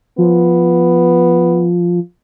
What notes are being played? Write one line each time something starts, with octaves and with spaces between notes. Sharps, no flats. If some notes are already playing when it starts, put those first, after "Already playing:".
F3 B3